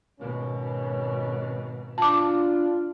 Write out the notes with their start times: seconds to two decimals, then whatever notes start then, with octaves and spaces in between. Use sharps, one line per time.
0.20 G#1 B2 C#4
1.98 D4 F4 A5 D6